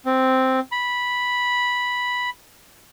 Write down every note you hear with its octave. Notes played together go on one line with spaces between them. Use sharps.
C4
B5